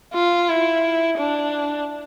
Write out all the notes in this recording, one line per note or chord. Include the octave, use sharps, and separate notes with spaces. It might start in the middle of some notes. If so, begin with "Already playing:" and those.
F4
E4
D4